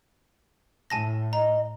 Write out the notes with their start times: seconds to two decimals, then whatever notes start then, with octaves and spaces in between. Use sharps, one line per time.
0.90 A2 G#5 A5 A#6
1.33 D#5 A#5